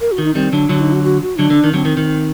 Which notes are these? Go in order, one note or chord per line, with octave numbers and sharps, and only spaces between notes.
A#4
F#4
D#3
D#4
D#3 G3 C4
D3 F#3 D4
D3 F#3 F#4
D#4
F#4
F#4
F#4
D3 F#3 D4
D3
D#3
D3 F#3 C4
D#3
D#3